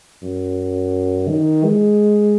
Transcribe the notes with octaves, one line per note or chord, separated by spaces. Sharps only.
F#2
D#3
G#3